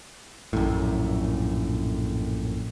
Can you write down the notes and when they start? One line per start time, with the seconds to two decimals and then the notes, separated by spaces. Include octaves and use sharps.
0.53 A#1 F#2 A2